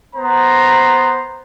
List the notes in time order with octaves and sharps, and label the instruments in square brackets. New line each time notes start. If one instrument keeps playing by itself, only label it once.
[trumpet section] B3 C5 A#5